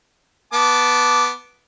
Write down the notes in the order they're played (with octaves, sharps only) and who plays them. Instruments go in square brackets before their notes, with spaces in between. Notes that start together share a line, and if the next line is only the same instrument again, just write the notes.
[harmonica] B3 A5 D6